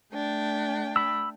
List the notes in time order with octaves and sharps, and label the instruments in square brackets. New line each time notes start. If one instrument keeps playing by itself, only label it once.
[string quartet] A3 D4 G5
[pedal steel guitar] B5 E6